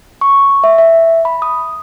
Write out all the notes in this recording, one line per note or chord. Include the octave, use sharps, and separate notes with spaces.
C#6
E5
E5
B5
D#6